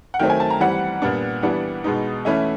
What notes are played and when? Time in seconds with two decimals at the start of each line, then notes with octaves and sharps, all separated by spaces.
0.14 F#5
0.19 D#3 F#3 A3 C4 G5
0.30 G#5
0.40 A5
0.50 A#5
0.60 E3 G3 C4 F#5
1.02 A#2 G3 B3 D4
1.43 E3 G3 B3 D4 F#5
1.84 B2 G#3 B3 D#4
2.25 E3 A3 C#4 E4